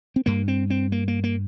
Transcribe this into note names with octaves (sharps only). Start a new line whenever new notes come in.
C4
G2 A#3
C4
C4
A#3
A#3
A#3